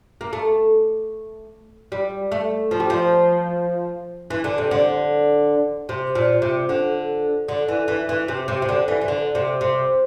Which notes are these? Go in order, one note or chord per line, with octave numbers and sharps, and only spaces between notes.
A#3
A3
G3
A3
F3
G3
F3
E3
D3
C3
D3
C3
A#2
C3
D3
D3
E3
E3
E3
C3
C3
C3
D3
E3
E3
D3
C3
C3